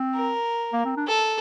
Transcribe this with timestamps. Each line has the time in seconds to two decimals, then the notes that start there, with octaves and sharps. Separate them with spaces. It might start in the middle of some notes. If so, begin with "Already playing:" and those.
Already playing: C4
0.15 A#4
0.73 A#3
0.85 C4
0.97 D4
1.08 A4